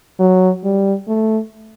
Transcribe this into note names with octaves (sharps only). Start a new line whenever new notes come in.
F#3
G3
A3